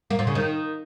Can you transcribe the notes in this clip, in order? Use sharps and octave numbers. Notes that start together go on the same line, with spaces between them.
A#3
A#2
C#3
D#3